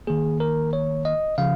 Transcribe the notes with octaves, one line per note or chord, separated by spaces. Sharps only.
D#3 A#3 G#4
A#4
C#5
D#5
C#3 F3 F5